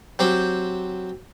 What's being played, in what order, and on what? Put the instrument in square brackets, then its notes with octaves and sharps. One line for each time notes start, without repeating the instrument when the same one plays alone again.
[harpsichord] F#3 C4 G4 C5